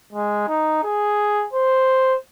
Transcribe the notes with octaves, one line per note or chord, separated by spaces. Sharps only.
G#3
D#4
G#4
C5